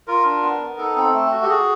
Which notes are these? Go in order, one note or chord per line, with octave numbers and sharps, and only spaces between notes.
F4 A#4
D4
B3
B3
D#4 A4
C4
A3
F#4
G4
F#4 G#4